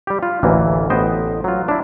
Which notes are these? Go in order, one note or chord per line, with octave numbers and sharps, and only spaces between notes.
G3 G4
F4
A1 D2 E3 A#3
A1 B3 C5 D#5 G5
F#3 F4
D4 E4